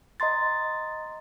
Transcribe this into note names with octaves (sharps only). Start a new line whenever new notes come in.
D#5 A#5 C6 A6